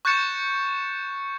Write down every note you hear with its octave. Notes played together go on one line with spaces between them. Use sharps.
C#6 F#6 G6 A6 C#7 E7